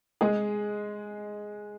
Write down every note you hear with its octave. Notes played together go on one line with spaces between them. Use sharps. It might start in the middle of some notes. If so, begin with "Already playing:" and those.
G#3 G#4